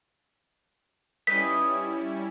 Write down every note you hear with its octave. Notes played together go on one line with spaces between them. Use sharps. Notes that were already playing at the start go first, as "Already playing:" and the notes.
G3 C#4 D#4 E4 B4 D#5 B6